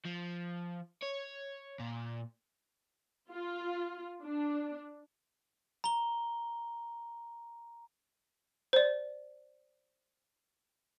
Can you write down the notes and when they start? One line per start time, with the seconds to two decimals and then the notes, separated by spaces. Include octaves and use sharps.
0.05 F3
1.02 C#5
1.79 A#2
3.30 F4
4.23 D4
5.84 A#5 G7
8.73 C5 D5